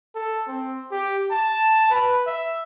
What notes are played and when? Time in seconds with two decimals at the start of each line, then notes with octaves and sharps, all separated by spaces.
0.15 A4
0.48 C4
0.92 G4
1.32 A5
1.91 B4
2.27 E5